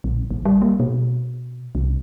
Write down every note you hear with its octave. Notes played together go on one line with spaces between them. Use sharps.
A#1
A1
G3
A#3
B2
C2